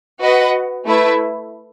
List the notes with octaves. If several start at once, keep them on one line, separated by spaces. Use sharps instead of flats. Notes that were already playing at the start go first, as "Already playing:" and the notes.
F#4 B4 D#5 F#5
A3 E4 B4 E5